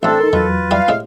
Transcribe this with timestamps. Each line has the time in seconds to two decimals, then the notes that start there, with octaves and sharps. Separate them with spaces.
0.03 A1 A3 C4 D4 A4
0.20 D#4 A#4 C6
0.33 E2 D#3 F#3 F4 B4
0.71 G3 E4 G4 F5
0.88 A2 C3 G#3